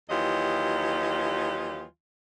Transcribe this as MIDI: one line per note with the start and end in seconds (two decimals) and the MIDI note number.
0.10 1.84 39
0.10 1.84 52
0.10 1.84 54
0.10 1.84 65
0.10 1.84 67
0.10 1.84 75